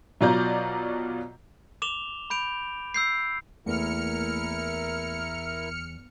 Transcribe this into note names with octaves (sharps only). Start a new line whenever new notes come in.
B2 F#3 F4 D5 A#5 G6
D6 E7 F7 G7
B5 G6 D7 F7
E6 G6 C7
E2 A3 A#3 E4 A#4 F6 C#7